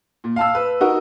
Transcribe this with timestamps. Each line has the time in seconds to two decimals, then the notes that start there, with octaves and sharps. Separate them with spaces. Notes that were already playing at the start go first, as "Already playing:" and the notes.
0.24 A#2
0.36 F5 A5 E6
0.55 B4
0.81 D#4 F#4 A#4